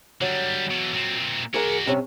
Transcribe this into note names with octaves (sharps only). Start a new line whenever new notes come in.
D3 F#3 G3
B2 E3
A#2 C4
F#4 G#4 A#4 D5 F#5
G2 C3 C#4